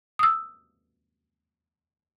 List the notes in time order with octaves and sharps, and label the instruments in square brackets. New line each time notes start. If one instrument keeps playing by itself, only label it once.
[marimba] D#6 E6